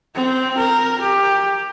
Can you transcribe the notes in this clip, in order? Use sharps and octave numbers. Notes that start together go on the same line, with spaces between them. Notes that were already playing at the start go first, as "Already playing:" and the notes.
C4
A#4
G4